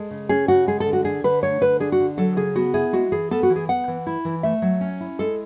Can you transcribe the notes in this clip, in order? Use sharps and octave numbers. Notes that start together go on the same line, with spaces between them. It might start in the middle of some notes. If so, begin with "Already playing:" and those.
Already playing: G#3 A4
C#3
C#4 G#4
C#3 F#4
G#3 G#4
A4
D3
F#4
D4 G#4
D3 B4
A3 C#5
D3 B4
D4 G#4
F#4
D3
F#3 A4
C#3 G#4
B3 F#4
E4 G#4
G#3 F#4
E3 G#4
B3 A4
F#4
E3
G#4
B3 F#5
E3
E4
E3
A3 E5
F#3
C#4
E4
G#3 A4